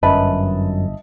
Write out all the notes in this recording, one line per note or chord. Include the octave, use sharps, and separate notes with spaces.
G1 F#2 B4 D#5 E5 A5